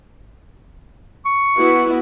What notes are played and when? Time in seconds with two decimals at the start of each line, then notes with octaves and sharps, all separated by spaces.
1.25 C#6
1.57 B3 E4 F#4